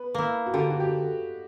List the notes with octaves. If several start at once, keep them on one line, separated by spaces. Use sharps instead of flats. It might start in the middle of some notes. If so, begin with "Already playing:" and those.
Already playing: B3 B4
A#3 E4
F#4
D3 G4
F#4
G4